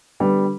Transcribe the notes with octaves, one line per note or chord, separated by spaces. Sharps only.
D3 G3 B3